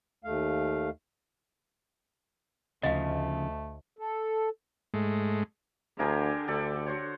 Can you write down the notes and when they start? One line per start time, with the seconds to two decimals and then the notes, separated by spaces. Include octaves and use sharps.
0.24 D#2 A3 F5
2.83 D2 C#3 F3 A3 D#5 F5
3.99 A4
4.94 G#2 G#3 A3
5.99 D2 D3 G4 G#4 A#4
6.48 D2 G4 A4 D5
6.86 F#4 C5 C#5